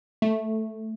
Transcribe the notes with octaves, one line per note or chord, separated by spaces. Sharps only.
A3